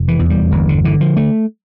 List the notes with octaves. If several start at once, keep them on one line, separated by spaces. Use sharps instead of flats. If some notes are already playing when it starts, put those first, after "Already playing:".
Already playing: F1
E3
E2
G3
G1 E3
D3
D3 E3
F3
A3